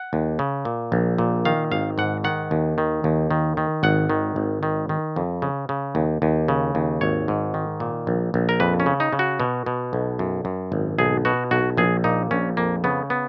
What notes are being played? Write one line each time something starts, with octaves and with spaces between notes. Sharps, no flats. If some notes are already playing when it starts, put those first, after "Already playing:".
Already playing: F#5
D#2
C#3
A#2
A#1
A#2
D#3 F5
G#1 F5
G#2 F#5
D#3 F#5
D#2
D#3
D#2
D#3
D#3
G#1 F#5
D#3
G#1
D#3
D#3
F2
C#3
C#3
D#2
D#2
C#3
D#2
G#1 C#5
G#2
D#3
A#2
A#1
A#1
A#4
F2 B4
C#4
C#3
D#4
C#3
F#4
B2
B2
B1
F#2
F#2
G#1
B1 G#4
B2 F#4
B1 F#4
A#1 G#4
A#2 D#4
A#1 C#4
F2 A#3
C#3 B3
B3